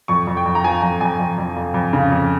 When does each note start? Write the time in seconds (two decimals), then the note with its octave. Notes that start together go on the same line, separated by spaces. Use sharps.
0.08 F2 C#6
0.27 F2
0.37 G5
0.46 F2
0.55 A#5
0.64 F3 G#5
0.82 F2 A#5
1.01 F2 G#5
1.20 F2
1.38 F2
1.57 F2
1.74 F2
1.93 C#3
2.12 F2